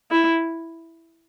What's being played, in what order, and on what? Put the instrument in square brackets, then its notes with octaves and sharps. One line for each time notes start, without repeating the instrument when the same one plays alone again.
[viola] E4